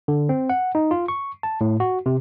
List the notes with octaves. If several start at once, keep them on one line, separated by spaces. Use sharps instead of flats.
D3
C4
F#5
D#4
F4
C#6
A5
A2
F#4
C3